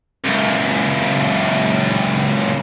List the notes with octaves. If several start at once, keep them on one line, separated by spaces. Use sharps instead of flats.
C#2 F#2